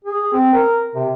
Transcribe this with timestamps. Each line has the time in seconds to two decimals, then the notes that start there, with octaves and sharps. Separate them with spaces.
0.04 G#4
0.33 C4
0.54 A#4
0.95 C3